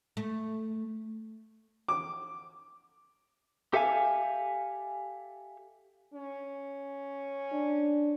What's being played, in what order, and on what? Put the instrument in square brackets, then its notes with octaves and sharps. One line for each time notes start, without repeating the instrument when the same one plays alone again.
[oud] A3
[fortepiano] D6
[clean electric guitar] G4 A4 E5 F5 G#5
[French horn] C#4
[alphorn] D4